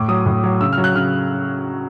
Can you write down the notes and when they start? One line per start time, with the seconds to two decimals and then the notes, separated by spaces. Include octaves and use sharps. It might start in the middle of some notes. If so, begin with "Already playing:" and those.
Already playing: A2 D6
0.08 F#3 D#6
0.26 A2
0.44 F#3
0.61 C#3 E6
0.73 F6
0.78 F#3
0.84 F#6
0.95 C#3 F6